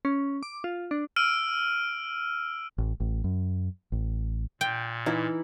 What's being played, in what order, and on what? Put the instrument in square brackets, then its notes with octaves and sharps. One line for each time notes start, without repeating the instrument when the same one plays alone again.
[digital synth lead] C#4
D6
F4
D4
[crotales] E6 F6 D7 D#7
[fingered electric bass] A1
A1
F#2
A1
[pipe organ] A#2 [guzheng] G5
[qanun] E3 E4 [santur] D#4 F5 B5